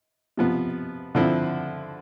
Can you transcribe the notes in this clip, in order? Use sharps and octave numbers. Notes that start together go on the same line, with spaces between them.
C3 F3 B3
D3 F3 C4 E4